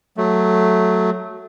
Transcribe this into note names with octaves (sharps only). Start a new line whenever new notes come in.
F#3 A3